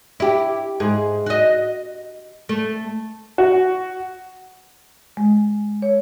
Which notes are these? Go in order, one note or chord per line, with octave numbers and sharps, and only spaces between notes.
E4 G4
G#2 G#4
F#4 D#5
A3
F#4
G#3
C#5